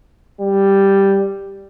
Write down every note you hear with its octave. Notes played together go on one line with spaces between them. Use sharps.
G3